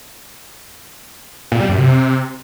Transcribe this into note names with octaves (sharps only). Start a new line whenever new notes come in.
A#2
G3
F#2
C3